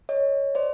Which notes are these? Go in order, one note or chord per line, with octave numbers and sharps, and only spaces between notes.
C#5 D#5
C5 D5